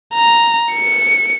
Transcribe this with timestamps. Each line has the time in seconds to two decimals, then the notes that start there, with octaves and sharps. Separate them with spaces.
0.14 A#5
0.73 C#7